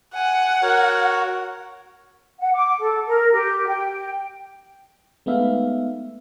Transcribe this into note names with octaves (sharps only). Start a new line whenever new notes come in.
F#5 G#5
F#4 A#4 C#5
F#5
D6
A4
A#4
G4
G5
G#3 A3 B3 D#4 E5 F5